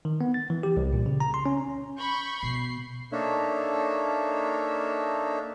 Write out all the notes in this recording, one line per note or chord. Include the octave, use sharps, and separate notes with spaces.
D#3
B3
A6
E3
G4
C2
A#2
C#3
A#5
C6
C#4
B5 C#6 G6
B2 B3 C7
A#3 D4 D#4 A4 C#5 E5